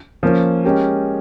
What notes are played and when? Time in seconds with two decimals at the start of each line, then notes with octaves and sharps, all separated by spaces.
0.23 F3 A#3 C#4
0.64 G#3 C#4 G4 A#4